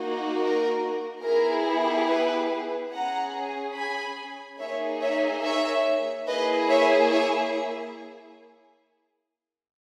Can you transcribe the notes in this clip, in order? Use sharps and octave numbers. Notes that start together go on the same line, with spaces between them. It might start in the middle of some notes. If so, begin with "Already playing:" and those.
Already playing: A#3 D#4 F#4
A#4
B3 E4 G#4 A#4
B4
C#4 G#4 F#5 A#5
G#5 B5
A#3 D#4 G#4 C#5 E5
C#5 E5
C#5 E5
A#3 E4 G#4 B4 D#5
C#5 E5
C#5 E5